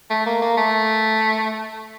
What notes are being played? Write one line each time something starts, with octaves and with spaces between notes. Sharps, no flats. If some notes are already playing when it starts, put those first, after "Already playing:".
A3
A#3
A#3
A3